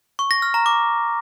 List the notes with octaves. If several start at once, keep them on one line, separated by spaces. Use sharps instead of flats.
C#6
A#6
F6
A#5
D6